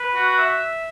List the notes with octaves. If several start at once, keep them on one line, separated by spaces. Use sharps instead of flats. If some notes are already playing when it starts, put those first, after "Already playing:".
Already playing: B4
F#4
E5